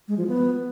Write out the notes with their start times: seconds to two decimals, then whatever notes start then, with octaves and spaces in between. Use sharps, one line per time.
0.08 G#3
0.18 F3
0.27 B3